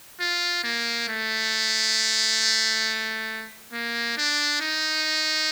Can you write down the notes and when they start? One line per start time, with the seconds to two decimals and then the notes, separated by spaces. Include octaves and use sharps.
0.20 F4
0.64 A#3
1.08 A3
3.73 A#3
4.17 D4
4.61 D#4